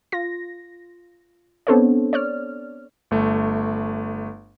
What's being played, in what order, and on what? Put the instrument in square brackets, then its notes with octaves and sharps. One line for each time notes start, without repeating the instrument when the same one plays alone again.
[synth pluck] F4 A#6
B3 C4 D4 A4 C5 C#5
C#5 D5 F6
[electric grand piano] G1 A3